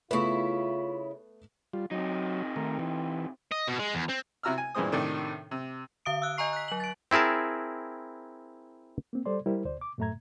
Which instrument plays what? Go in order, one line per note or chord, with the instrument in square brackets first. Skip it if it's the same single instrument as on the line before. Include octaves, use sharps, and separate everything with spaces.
[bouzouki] C#3 E4 [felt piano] A3 B3 B4 [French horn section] F4
[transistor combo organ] G3 F4
[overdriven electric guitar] C3 D#4 [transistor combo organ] F#3
[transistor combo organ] D#3 A3 A#4
E3
[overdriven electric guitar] D#5
B2
G#3
E2
C4
[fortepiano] C3 E4 F#4 A#5 E6 F6
G#5
G2 A#2 E3 G#3 C5 D#6
A2 C3 D#3 D4
C3
[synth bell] D3 F5 D#6 D7
E6 F#6
D#5 G#5 A#5 C#6 C7
F#6 B6
F#3 F#7
A6 D7
[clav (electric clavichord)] C4 E4 G#4 A#4 A5
[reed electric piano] A#3 C4
G3 A4 C5 D5 C6
G3 E4 A#4 C5
D2 C5 D5
D6
F#2 A2 A3 E5 A#5 G#6